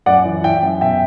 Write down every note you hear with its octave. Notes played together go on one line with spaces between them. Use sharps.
F#2 D5 F#5
E3
E3 E5 G5
F#2
B2 E5 G5